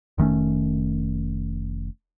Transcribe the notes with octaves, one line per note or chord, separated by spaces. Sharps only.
F1 D#3 A3 C#4